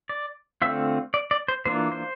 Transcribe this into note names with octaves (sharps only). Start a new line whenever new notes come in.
D5
D3 A3 C4 F4 E5
D5
D5
C5
E3 A#3 D4 F4 C5
C5